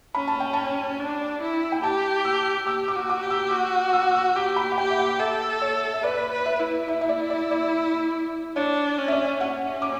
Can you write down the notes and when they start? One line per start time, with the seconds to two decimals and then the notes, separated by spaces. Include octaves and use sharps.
0.15 C#4 B5
0.28 A5
0.40 G5
0.53 A5
0.99 D4
1.41 E4
1.72 G5
1.83 G4 A5
2.25 E6
2.67 G4 E6
2.88 D6
2.96 F#4
3.09 D6
3.23 G4
3.30 E6
3.51 F#4 D6
3.93 E6
4.15 E6
4.36 G4 D6
4.56 B5
4.72 F#5
4.78 G4 G5
4.90 E5
4.99 F#5
5.20 A4 E5
5.62 C#5
5.94 E5
6.03 B4 D5
6.31 B4
6.46 E5
6.60 E4
6.88 E5
7.01 E5
7.09 D5
7.30 D5
7.51 D5
8.56 D4 C#5
8.98 C#4
9.08 E5
9.12 D5
9.41 C#4 F#5
9.82 D6